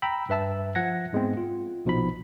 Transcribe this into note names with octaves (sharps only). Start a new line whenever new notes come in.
G5 A#5 B5 E6
G2 B4 E5 A5 E6
F3 F#5 G#6 A#6
G#2 G#3 B3 C4
F4
A#1 B2 F3 D#4 B5